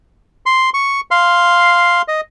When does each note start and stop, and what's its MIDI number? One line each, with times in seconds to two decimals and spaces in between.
0.46 0.70 84
0.74 1.01 85
1.11 2.02 77
1.11 2.02 84
2.08 2.21 75